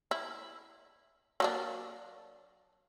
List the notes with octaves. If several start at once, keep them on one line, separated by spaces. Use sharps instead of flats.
E4
F#3 A#3 D4